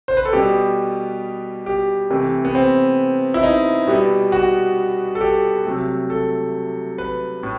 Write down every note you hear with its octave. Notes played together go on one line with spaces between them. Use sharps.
C5
B4
A4
B2 G3 B3 G4
G4
C3 E3 A3
B3
C4
E4
D#4
B2 G3 B3
F#4
A4
G4
C3 F#3 A3
A4
B4
A2